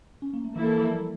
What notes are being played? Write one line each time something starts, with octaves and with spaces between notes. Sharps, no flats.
C#4
A#3
A3
E3 A#3 E4 A4
E3
F3
G3